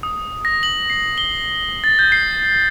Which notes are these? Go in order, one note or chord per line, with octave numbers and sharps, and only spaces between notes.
D#6
A#6
F#7
C7
G7
A6
G6
C7